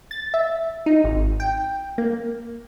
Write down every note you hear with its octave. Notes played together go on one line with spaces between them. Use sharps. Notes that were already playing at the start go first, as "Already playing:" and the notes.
A6
E5
D#4
G#1
G5
A#3